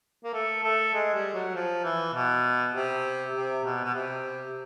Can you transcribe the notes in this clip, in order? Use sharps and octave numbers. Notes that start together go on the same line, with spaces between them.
A#3
A3
A3
G#3
G3
F#3
F3
E3
B2
C3
C3
B2
B2
C3